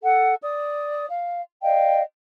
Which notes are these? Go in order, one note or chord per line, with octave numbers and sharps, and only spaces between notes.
A4 F#5
D5 D#6
F5
D5 D#5 F5 G5